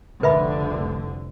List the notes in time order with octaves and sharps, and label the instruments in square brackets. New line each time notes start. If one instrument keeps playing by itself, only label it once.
[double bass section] F1 C2 D3 [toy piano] B4 E5 B5